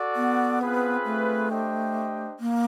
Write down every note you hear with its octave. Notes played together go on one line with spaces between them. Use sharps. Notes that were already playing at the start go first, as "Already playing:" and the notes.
Already playing: F#4 A4 D5
B3
C4 F4 G#4 B4
A3
D4 G4 C5 D#5 G5
A#3